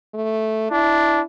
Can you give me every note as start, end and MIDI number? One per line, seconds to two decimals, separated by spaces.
0.14 0.68 57
0.71 1.21 62
0.71 1.24 64